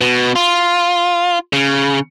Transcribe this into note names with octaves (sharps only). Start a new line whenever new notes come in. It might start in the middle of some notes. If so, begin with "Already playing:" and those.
B2
F4
C#3